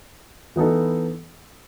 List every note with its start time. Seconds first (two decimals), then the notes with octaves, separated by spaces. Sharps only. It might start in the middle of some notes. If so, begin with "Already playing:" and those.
0.56 E3 B3 D#4 A4